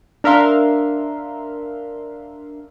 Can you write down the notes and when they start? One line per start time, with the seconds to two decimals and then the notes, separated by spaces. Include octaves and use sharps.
0.24 D4 A#4 E5 F5 C6